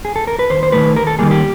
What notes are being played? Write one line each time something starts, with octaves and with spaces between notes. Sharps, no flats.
G#4
A4
A#4
B4
D#2 C5
C5
D#3 F#3 A3 B4
D#2 A#4
A4
D#3 G3 A#3 G#4
G4